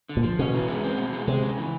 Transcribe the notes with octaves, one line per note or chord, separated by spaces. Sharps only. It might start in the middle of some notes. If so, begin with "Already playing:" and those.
D3
A#2
F3
B2 C#4
E3
G#3
C4
B2
G#3
C3 G#3
C#3
E3